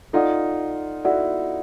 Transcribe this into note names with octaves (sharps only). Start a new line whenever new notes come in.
D#4 F4 A4 D5 F#5
E4 F#4 A4 D5 F#5